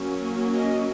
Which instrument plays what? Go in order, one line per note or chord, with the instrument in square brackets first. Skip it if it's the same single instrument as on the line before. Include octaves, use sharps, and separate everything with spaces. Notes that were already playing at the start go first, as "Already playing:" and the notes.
Already playing: [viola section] F#3 A#3 C#4
D#5